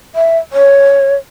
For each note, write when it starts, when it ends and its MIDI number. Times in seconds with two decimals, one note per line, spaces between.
0.15 0.38 76
0.52 1.15 73